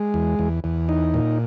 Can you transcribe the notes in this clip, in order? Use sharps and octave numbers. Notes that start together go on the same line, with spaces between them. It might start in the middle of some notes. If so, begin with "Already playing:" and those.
Already playing: G#3
E2
E2
E2
D#4
A#2